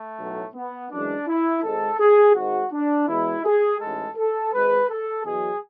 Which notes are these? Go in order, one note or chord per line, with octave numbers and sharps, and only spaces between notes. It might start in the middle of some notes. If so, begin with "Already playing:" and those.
Already playing: A3
B1 A2 F#3
B3
F#2 E3 G#3 D4
E4
G#1 G#2 G#3 A4
G#4
G#1 G#2 G#3 F#4
D4
E2 B2 G#3 E4
G#4
A1 G#2 G#3 A4
A4
G#1 G#2 G#3 B4
A4
E2 B2 F#3 G#4